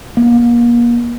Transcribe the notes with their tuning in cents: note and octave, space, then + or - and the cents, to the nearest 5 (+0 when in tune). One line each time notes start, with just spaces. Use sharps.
A#3 +35